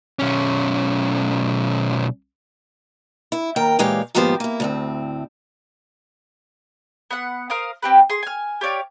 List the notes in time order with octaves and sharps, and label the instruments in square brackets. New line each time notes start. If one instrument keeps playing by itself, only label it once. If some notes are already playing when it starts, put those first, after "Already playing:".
[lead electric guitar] B1 C#4
[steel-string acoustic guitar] E4
D#2 A#4 G5
A#2 E3 G#3 G4 C#5 F5
D#2 G#2 F3 B3 G4 C5
A#3 E4
D2 A2 C4
[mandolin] B3 F#5
A#4 C5 F5 D#6
C4 G4 B4
G#4 C6
G#5 F6
G4 C#5 D5 F5